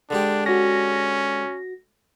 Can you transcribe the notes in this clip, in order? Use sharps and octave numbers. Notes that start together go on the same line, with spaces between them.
D3 G#3 D4 G4
C#4 F#4 A#6